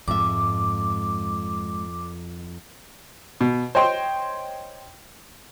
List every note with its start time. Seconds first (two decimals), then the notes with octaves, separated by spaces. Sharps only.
0.08 F2 G#2 E5 D6
3.41 B2
3.75 C5 C#5 D#5 G5 C6